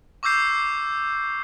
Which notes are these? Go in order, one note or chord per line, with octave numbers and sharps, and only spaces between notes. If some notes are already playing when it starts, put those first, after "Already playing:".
C#6 D6 E6 G6 C7